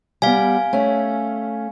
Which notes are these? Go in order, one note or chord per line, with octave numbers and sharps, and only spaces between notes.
G3 B3 F5 G#5
A3 C#4